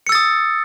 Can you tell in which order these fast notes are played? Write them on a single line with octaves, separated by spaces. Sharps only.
C#7 E6 A6 D#6